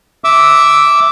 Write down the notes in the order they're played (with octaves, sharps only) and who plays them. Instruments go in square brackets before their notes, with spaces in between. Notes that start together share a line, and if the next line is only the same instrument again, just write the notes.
[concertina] E5 D6 E6